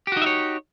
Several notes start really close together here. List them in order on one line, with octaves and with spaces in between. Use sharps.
G4 F#4 D#4 E5 C#5